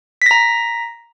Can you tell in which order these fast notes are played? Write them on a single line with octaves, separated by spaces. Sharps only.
B6 A#6 A#5